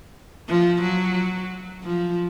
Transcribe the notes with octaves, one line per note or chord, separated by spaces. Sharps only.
F3
F#3
F3